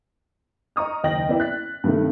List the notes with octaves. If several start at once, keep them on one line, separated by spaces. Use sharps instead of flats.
D#5 A#5 C#6 D#6 F6
F#1 D#2 D#5 G5 A#6 F#7
B3 E4 D5 E5 G5
F#6 A6 B6
G2 C3 D#3 A3